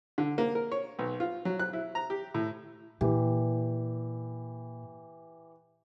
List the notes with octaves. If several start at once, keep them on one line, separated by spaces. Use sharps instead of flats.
D3
A#3
A#4
C#5
B1
F4
F#3
F#6
E4
A#5
G4
A2
A#2 E3 G4